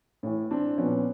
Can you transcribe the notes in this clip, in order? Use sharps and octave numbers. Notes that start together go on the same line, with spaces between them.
A2 E3
C4 D4
A#2 F3 B3 C#4